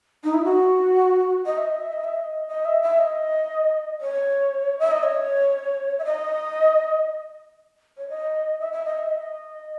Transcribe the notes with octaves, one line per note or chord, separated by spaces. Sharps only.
D#4
E4
F#4
D#5
E5
D#5
E5
D#5
E5
D#5
D#5
E5
E5
D#5
C#5
E5
D#5
C#5
E5
D#5
C#5
D#5
E5
E5
D#5
E5
D#5